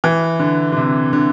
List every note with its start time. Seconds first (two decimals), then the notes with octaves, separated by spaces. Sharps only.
0.04 E3
0.39 D3
0.72 D3
0.77 C3
1.13 D3